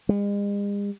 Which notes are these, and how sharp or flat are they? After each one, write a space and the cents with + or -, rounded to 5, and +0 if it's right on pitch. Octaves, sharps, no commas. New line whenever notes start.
G#3 -45